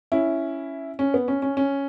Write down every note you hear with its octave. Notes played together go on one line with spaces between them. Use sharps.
C#4 E4
C#4
B3
C#4
C#4
C#4